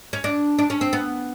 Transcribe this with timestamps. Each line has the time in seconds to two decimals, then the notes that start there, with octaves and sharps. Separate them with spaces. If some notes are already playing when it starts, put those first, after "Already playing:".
0.13 C#4
0.24 D4
0.59 D4
0.70 C#4
0.81 C4
0.93 B3